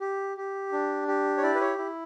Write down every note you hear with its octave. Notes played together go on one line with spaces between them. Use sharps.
G4
G4
D4
G4
C#5
E4 D5
B4
C#5
E4